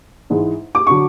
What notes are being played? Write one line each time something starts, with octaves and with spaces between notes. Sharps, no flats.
G#2 E3 G#3
D6
D3 F#3 C#6